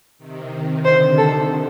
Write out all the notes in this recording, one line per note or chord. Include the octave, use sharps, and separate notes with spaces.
C3 D#3
C3 D#3
D3 C5
A4